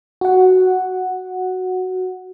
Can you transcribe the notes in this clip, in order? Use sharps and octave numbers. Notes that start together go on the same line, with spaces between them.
F#4 F#5